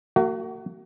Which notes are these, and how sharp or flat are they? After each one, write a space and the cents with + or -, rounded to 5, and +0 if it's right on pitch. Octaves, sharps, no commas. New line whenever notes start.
A#3 -40 F#4 +25